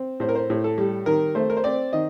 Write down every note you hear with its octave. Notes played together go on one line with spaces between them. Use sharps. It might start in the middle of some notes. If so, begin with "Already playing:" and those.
Already playing: C4
A2 C5
A#4
C5
A2
A4
G3
D#3 A#4
A3 C5
A#4
C5
C4 D5
D#3 D#5